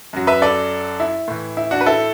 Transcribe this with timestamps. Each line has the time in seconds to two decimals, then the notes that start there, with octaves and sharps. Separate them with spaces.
0.13 F#2 F#3
0.27 B4 E5
0.42 A4 D5
1.00 E4
1.28 A2 E3
1.57 E4
1.71 D4 F#4
1.81 B4
1.86 E4 A4